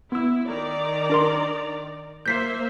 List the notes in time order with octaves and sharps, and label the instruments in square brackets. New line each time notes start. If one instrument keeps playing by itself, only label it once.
[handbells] B3 E6 [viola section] E4
[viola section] D#3 D5 A#5
[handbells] D4 A#4 C6
[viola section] A#3 C5 E5 [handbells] G6 B6 C7